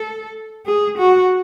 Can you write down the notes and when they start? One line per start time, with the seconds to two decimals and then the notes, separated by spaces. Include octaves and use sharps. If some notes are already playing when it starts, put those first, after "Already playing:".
Already playing: A4
0.65 G#4
0.98 F#4